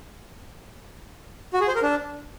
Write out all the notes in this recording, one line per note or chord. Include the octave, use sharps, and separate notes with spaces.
F#4
G#4
C5
A#4
D4